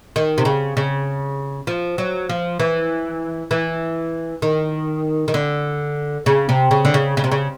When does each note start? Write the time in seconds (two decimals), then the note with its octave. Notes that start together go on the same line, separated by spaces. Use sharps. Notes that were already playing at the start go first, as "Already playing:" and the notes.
0.16 D#3
0.38 C3
0.45 C#3
0.77 C#3
1.67 F3
1.98 F#3
2.29 F3
2.60 E3
3.51 E3
4.42 D#3
5.28 D#3
5.34 D3
6.26 C#3
6.49 C3
6.71 C#3
6.85 D3
6.94 C#3
7.17 C#3
7.24 C3
7.32 C#3